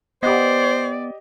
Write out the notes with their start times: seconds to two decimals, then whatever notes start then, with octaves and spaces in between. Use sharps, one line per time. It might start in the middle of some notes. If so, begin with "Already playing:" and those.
0.23 B3 G4 C5 D5 D#5